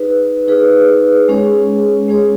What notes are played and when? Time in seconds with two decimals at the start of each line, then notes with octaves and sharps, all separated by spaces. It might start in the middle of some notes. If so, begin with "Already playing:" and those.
Already playing: D#4 G#4 B4
0.48 D#4 G#4 B4
1.28 G#3 C#4 G#4 C#5
2.08 G#3 C#4 G#4 C#5